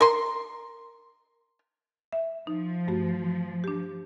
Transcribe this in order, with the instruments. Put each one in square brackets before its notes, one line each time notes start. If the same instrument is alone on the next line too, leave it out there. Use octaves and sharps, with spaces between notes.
[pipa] A#4 C6
[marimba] E5
[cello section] F3 [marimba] D#4
[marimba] G2 A3 F#4
D4 G4